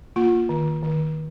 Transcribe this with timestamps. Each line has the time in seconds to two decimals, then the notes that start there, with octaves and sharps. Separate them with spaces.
0.16 A#3 F4
0.49 D#3
0.83 D#3